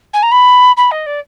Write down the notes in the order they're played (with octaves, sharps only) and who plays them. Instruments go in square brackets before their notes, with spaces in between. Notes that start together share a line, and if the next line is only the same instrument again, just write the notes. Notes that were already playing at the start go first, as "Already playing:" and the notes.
[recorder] G#5
A#5
B5
B5
D#5
D5